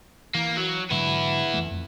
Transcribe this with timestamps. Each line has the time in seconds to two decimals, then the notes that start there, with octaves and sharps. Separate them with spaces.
0.35 E3 A#3
0.57 F#3
0.91 G#2 D3 F#3 B3 E4
1.54 F2 E3 A3
1.71 F2